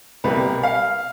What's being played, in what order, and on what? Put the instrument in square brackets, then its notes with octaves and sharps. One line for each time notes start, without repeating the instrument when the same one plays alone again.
[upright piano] C2 B2 G3 A#3 B4
F5